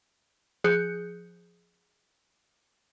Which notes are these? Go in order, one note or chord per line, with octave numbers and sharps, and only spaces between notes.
F3 G#4 F#6 G6 C#7